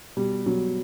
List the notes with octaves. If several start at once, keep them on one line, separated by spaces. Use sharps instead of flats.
B2 G3
B2 F#3